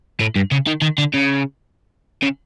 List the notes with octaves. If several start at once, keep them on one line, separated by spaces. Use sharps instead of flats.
A2
G2
C#3
D#3
D#3
D3
C#3
C#3